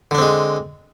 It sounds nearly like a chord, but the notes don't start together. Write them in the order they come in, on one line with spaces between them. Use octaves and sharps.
D3 D4 C4 G#3